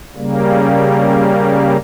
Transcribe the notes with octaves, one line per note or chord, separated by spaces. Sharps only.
C#3 G3 A#3